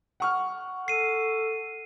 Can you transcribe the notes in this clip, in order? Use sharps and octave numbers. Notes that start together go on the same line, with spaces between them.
F#5 C#6 F6
A4 C7 D#7